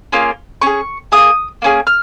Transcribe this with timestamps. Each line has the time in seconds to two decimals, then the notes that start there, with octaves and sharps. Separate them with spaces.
0.12 A#3 C#4 F4 G#4
0.62 C#4 G#4 C#6
1.12 F4 G#4 D#6
1.16 A#3
1.62 A#3 C#4 G#4
1.87 F6